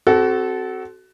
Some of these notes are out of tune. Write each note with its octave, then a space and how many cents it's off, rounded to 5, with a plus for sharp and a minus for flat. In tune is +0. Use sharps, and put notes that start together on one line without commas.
C4 +0 F#4 +20 A4 -20